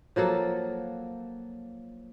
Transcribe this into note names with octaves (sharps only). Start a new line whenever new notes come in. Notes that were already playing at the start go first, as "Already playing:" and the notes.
F3 F#3 A#3 A4